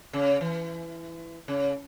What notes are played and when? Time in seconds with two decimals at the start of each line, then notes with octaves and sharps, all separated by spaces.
0.13 C#3
0.41 E3
1.48 C#3